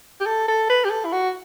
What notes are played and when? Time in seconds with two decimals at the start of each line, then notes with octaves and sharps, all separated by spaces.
0.20 G4
0.26 A4
0.48 A4
0.69 B4
0.85 G4
0.90 A4
1.05 E4
1.12 F#4